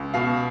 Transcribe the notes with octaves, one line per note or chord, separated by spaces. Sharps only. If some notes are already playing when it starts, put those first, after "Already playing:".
Already playing: C#2
B2 F5